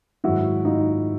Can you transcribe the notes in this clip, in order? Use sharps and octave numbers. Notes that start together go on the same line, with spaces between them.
G#2 D#3 F#3 E4 F#4
D#4 F4